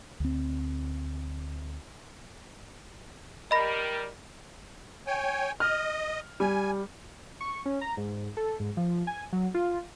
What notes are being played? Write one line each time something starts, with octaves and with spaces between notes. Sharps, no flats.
D2 C4
G3 A#4 D#5 B5 A#6
C#5 G5 G#5
D#5 F6
G3 G#5
C#6
C#4
A#5
G#2
A4
G#2
F3
G#5
F#3
F4